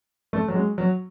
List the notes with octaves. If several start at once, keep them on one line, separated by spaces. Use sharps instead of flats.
A3
F#3
G#3
F#3